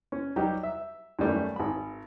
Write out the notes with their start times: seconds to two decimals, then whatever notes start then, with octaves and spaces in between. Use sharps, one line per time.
0.12 C#4
0.36 F#3 G3 D#4 G4
0.63 E5
1.19 F#2 D#3 G3 A3
1.56 G#1 B5